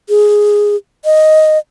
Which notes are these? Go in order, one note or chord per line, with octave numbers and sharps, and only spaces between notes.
G#4
D#5